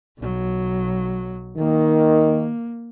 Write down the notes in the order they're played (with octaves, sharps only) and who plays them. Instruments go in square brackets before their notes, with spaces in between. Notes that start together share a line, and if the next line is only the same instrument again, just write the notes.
[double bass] B1 F#3
[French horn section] D#3 [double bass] A#3